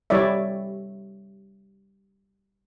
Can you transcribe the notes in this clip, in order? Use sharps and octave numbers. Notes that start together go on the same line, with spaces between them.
G3 E4 C#5 D5 E5